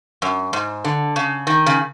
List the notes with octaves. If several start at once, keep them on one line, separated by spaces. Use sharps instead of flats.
F#2
G#2
D3
C#3
D#3
C#3